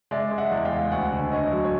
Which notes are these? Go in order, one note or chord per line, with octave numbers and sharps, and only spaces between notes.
G#3 D5 E5
G#3
E5 F#5
E2
F5 G5
G#3
D2 F#5 G#5
D3
D3 C#5 D#5
F#3
C#5